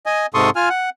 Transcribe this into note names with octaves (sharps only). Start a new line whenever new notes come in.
D#5 G#5
G#2 C3 A4 C6 C#6 D#6
F4 G#5 F6
F#5